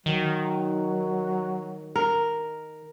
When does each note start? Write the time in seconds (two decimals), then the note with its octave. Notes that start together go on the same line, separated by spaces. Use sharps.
0.06 D#3 F#3
1.96 A#4